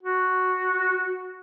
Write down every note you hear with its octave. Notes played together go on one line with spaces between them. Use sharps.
F#4